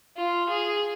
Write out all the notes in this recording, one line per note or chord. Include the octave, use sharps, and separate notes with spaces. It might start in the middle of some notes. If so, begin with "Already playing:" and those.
F4
G#4